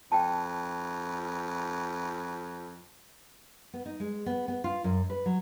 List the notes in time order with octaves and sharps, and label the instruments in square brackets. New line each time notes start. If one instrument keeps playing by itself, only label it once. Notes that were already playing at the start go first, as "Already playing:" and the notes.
[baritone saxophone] F2 [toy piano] G5 A5
[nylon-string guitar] B3
D#4
G#3
B3
B3
F4
F#2
B4
F#3